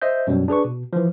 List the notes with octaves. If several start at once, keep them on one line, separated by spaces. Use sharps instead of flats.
C5 D#5 E5 G6
F#2 B2 F#3 G3
D4 G#4 B4 C#6
B2
E3 F3